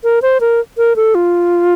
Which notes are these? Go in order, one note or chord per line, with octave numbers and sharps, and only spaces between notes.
A#4
C5
A#4
A#4
A4
F4